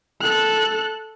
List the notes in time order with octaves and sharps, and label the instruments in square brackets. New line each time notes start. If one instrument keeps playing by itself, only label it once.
[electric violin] A4 F#6